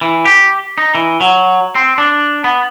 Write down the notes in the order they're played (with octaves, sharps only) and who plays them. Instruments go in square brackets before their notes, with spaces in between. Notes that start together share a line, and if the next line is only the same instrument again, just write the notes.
[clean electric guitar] E3
G4
D#4
E3
F#3
C4
D4
B3